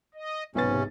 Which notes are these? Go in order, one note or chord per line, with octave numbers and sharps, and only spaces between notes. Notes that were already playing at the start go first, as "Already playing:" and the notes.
D#5
B1 G#2 C3 C#4 B4 A6